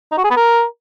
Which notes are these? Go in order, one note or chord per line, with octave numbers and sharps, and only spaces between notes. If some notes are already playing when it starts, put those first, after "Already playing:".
D#4
F#4
G#4
B3
A#4